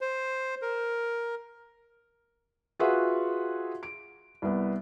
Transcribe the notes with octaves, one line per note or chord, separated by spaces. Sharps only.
C5
A#4
F4 F#4 G#4 B4 E5 F#5
D7
C2 B3